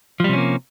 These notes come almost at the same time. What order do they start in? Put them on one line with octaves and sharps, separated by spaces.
F3 G3 C3 C#4 A#3